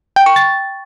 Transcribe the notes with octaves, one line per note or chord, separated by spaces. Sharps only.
G5
C#6
A6